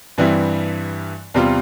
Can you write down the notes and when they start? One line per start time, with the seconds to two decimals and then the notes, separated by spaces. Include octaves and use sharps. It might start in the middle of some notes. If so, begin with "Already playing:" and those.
0.18 G2 E3 G3 C4 E4
1.34 E2 C3 G3 C4 F4